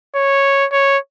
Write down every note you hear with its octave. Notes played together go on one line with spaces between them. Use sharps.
C#5
C#5